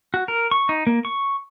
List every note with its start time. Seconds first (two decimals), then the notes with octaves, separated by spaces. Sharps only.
0.14 F#4
0.28 A#4
0.51 C#6
0.69 D#4
0.87 A#3
1.05 C#6